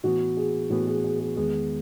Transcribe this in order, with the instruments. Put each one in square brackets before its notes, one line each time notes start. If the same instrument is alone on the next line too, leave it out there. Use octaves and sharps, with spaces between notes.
[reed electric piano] A2 E3 B3 [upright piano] F#4
[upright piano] G#4
[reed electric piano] A2 E3 B3 [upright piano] F#4
[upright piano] G#4
G#4
G#4
[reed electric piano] E2 D#3 G#3 B3 [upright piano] G#4